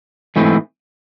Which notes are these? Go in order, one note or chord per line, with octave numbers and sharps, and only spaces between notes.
G#2 E3 A3 C4